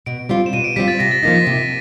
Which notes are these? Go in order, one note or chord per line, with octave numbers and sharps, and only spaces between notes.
B2 D7
G3 C4 F4
E7
B2 D#7
D7
G3 C4 F4 B6
A6
C3 A#6
A6
F3 A#3 D#4 A#6
B6
C3